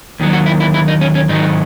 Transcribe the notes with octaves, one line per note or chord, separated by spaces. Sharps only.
D#2 D#3 F#3
F#4
E4
E4
E4
D#4
C#4
C#4
G#2 D#3 F#3 D#4